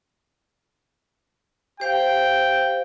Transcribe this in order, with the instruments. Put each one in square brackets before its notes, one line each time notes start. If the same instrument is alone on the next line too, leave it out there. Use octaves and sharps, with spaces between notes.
[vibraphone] G4 C5 F5 [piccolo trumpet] G5